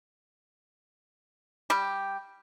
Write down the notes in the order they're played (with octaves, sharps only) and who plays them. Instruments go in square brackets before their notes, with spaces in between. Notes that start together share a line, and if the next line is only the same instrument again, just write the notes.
[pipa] G3 G4